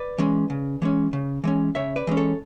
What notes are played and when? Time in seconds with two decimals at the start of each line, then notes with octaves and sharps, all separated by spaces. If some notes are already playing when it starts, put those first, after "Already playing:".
Already playing: B4 D5
0.18 E3 G#3 C#4
0.50 C#3
0.82 E3 G#3 C#4
1.13 C#3
1.44 E3 G#3 C#4
1.75 C#3 C#5 E5
1.96 B4 D5
2.07 E3 G#3 C#4
2.17 A4 C#5